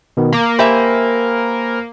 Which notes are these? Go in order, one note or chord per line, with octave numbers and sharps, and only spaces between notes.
B2 D#3 B3
A#3 A#5 D6
G4 A#4 C5 E5 G#5 B5